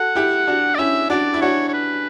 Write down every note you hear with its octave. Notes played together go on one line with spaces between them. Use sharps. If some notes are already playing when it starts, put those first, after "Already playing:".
Already playing: F#4 A4 F#5
E4 G4
D4 F#4
D5
C#4 E4 E5
D4 F#4 D5
E4
D4 F#4 C#5
C#5
B4